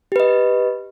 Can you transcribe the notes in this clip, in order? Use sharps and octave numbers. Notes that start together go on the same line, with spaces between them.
G4 B4 D#5